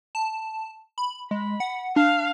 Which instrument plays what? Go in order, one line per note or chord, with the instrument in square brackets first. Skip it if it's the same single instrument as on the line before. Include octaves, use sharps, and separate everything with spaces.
[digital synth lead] A5
B5
[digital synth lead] G#3 [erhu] B5
[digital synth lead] F#5
[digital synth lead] D4 [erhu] F5